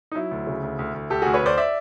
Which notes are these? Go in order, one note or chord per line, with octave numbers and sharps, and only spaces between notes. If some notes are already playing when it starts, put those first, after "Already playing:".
D#4
F#3 E4
D2
C#3
D2
D2
D2
D2 G4 A4
D2 F#4 G#4
B4 C#5
D2 C5 D5
D5 E5